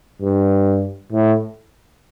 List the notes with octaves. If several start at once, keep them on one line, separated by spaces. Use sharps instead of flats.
G2
A2